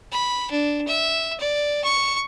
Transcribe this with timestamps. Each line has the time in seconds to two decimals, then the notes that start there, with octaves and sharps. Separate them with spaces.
0.12 B5
0.51 D4
0.87 E5
1.40 D5
1.84 C#6